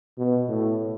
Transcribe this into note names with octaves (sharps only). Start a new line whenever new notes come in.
B2
A2